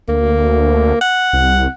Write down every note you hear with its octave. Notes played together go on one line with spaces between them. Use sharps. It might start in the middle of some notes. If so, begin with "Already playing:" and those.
D2 A#3
F#5
C2